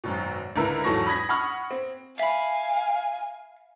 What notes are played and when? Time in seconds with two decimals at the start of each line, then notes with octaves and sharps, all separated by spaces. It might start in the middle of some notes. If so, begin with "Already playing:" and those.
0.04 G#1 F#2 B2
0.56 C#2 D3 E4 A#4 B4 E6
0.84 E2 G#2 F#3 A4 C#6 A#6
1.07 B5 D#6 G#6 A#6 B6
1.29 F#5 B5 C#6 D#6 F6
1.71 C4
2.19 E5 F5 G#5 B5